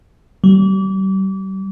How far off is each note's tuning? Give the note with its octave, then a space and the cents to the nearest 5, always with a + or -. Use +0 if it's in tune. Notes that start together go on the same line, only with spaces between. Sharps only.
G3 -35